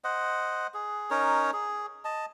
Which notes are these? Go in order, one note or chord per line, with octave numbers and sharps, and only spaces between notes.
C5 D#5 F#5
G#4
C#4 D#4 A#4 C#5
G#4
D#5 A5